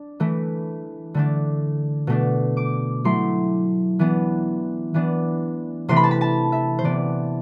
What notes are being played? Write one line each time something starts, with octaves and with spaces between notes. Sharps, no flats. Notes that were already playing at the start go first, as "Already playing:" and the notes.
Already playing: D4
E3 A3 E4
D3 A3 D4
B2 A3 D4
D6
F#3 A3 E4 C6
E3 B3 D4
E3 B3 D4
C3 E3 A3 C6
B5
A5
B5
A5
E5
C5
C3 E3 B3 D5